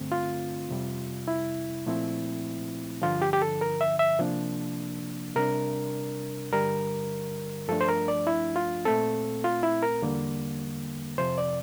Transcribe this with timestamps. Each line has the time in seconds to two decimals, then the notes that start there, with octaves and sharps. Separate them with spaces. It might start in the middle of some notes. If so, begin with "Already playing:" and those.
Already playing: G2 D3 A3 C4
0.12 F4
0.69 F2 C3 G3
1.28 E4
1.86 A#2 F3 A3 C4 E4
3.02 G2 D3 F3 F4
3.22 G4
3.33 G4
3.42 A4
3.61 A#4
3.81 E5
3.99 E5
4.19 C3 F3 A#3 D4
5.36 C3 G3 D4 A#4
6.52 G2 D3 G3 A#4
7.68 G2 F3 A3 D4 A4
7.81 C5
7.88 A#4
8.08 D5
8.27 E4
8.56 F4
8.85 A#2 A3 C4 A4
9.44 F4
9.63 E4
9.83 A#4
10.02 E2 D3 G3 A#3
11.18 F2 C3 F3 C5
11.38 D5